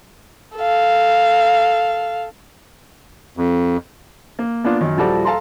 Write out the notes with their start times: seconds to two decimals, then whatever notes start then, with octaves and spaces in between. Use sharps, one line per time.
0.57 A4 F5
3.37 F2
4.39 A#3
4.64 A#3 B3 D4 F4
4.81 F#2 D#3
4.97 D#1 F3 G3 F#4 A4 D5
5.25 A4 F5 A5 A#5 C6